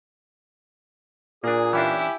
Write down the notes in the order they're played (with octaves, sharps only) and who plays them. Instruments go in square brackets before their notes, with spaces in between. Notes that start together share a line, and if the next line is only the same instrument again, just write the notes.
[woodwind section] A#2 [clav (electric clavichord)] A#3 D4 [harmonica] G#4
[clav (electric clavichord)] E3 C#4 D4 [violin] E4 [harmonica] G4 G#5